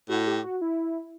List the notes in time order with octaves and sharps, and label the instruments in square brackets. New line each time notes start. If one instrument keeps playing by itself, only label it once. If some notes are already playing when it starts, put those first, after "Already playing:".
[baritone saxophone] A2 [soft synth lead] F#4
[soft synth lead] G4
F#4
E4